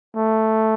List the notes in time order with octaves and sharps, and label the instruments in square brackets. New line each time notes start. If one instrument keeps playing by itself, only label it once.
[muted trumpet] A3